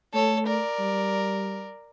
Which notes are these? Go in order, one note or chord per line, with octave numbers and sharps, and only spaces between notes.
A3 A4 C#5
A#4 D5
G3